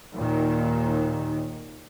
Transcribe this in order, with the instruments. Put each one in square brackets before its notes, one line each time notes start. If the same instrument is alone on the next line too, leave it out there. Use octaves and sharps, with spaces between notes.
[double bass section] D#2 A#2 D#3